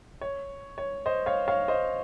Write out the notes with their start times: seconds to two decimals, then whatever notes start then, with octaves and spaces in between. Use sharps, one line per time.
0.21 C#5
0.78 C#5
1.06 C5 D#5
1.26 C#5 F5
1.48 C#5 F5
1.68 C5 D#5